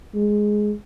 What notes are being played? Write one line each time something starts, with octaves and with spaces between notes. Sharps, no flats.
G#3